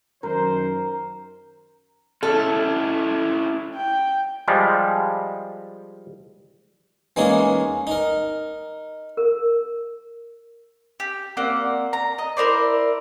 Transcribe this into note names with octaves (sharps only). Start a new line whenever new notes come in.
F#2 D#3 A#4 C5
C#4 D4 E4 A4
G5
F3 G3 G#3
E3 G#3 A#3 C#4 D#4 G#4
D#4 A#4
A#4
G4
A#3 C4 D5 F#5
A#5
D#5
E4 A#4 C5 D5